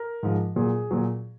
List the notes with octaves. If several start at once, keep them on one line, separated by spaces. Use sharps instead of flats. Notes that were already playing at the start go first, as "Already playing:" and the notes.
Already playing: A#4
G#2 F3
A#2 F#3 G#4
A#2 F#3